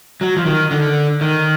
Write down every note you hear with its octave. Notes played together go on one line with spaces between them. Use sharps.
F#3
F3
D#3
D3
D#3